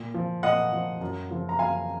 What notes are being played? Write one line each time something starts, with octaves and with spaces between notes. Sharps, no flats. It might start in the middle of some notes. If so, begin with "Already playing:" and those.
Already playing: A#2
F3
A#2 D#5 F#5
F3
F#2
C#3 F3
A#5
F#2 F5 G#5